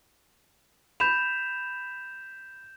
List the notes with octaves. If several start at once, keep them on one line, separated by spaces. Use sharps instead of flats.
B5 G6 E7 F7